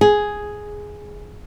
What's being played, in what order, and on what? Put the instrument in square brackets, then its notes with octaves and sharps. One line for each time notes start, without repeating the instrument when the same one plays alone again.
[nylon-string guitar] G#4